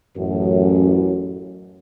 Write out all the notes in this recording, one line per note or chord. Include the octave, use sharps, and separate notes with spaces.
A1 F#2